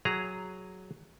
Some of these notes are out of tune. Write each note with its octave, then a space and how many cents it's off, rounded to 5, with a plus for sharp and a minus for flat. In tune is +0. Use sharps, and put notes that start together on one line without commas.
F#3 +0 G#4 +0 A#5 -5